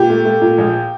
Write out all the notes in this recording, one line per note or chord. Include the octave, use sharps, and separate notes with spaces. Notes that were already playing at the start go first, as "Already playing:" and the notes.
Already playing: A#2 G4
A3
A3
A#2
A#1